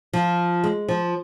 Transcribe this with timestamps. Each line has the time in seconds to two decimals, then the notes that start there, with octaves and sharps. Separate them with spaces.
0.13 F3
0.64 G#3
0.88 F3